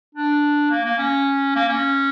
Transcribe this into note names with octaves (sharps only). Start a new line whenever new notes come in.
D4
A#3
A#3
C#4
A#3
C#4